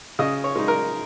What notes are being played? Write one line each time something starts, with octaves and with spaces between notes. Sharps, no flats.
C#3 D#5
C#5
G#3 D#4
A#4